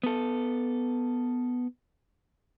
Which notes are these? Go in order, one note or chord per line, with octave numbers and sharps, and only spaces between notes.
B3 A4